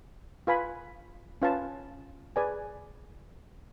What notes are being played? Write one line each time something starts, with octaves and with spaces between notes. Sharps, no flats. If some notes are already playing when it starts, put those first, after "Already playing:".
F4 B4 F5 G#5 B5
C#4 F4 B4 F5 A5
G#4 B4 D5 G#5